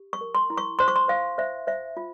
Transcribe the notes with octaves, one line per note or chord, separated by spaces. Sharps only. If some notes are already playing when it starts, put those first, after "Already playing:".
Already playing: G4
C#6
A#4
C6
E4
C#6
C5 C6
C#6
C6
C5 F5
C5 E5
C5 E5
F4